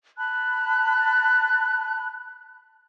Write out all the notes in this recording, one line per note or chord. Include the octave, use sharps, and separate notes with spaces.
A5 B5 F#6